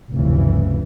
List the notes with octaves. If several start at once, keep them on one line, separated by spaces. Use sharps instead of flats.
F1 D2 G2 C#3 E3